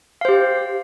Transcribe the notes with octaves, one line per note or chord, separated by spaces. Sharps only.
G4 C5 F5